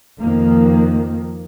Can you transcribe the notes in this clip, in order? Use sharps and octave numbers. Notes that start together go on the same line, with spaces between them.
F2 D#3 F3 A#3